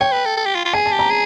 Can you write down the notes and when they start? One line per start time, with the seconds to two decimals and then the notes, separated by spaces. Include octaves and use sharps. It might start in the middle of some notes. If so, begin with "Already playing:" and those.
0.01 C#5 G5
0.12 B4
0.25 A4
0.37 A4
0.46 G4
0.55 F4
0.65 F4
0.73 G#4 G#5
0.86 A5
0.92 G4
0.99 A#5
1.10 G#4